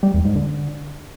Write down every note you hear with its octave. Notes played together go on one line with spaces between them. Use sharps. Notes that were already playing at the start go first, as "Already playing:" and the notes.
G3
E2
G#2
D3